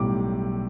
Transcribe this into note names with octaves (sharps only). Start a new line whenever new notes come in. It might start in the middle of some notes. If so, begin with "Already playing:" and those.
Already playing: B1 A2 G3 D6